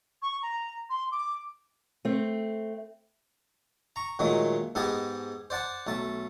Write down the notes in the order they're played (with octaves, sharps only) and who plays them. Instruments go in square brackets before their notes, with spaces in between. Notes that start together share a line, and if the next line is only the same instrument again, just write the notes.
[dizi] C#6
A#5
C6
D6
[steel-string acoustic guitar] A3 C4
[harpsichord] A#5 C#6
A#2 D#3 F#3 G#3 A3
G#2 B3 G4 G#4 D#5 A5
C5 D5 F#5 A5
B1 A3 A5